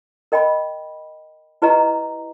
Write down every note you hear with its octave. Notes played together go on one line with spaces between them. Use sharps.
A#4 D#5 G5 B5
E4 G4 B4 D#5 A#5